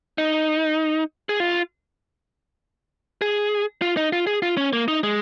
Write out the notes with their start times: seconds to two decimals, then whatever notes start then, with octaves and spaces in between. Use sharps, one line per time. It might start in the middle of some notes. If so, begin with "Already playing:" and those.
0.18 D#4
1.29 G#4
1.40 F4
3.22 G#4
3.82 F4
3.97 D#4
4.13 F4
4.27 G#4
4.42 F4
4.57 C#4
4.73 A#3
4.88 D#4
5.03 G#3